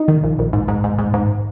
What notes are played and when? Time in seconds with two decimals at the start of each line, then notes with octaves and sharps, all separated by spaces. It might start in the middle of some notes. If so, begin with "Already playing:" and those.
Already playing: D#4
0.08 D#3
0.23 A#1
0.39 A#1
0.53 G#2
0.68 G#2
0.84 G#2
0.99 G#2
1.14 G#2